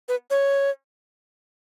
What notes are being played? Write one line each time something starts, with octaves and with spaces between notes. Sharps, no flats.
B4
C#5